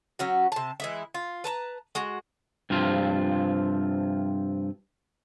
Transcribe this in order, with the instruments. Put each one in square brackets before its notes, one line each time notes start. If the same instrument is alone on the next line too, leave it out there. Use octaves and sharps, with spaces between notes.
[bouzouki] F#3 C#4 F#4
C3 A5
E3 G#3 E4
F4
B4 A5 A#5
G#3 F#4
[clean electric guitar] G2 C3 F3 F4